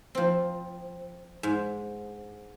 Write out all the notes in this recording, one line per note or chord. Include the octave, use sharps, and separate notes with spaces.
F3 C4
G#2